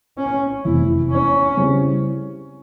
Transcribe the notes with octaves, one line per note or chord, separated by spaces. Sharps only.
C#4
F1 E2 C3 E4
C#4
C#3 G3 C4 E4